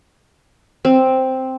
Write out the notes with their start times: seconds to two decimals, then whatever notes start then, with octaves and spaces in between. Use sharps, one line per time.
0.85 C4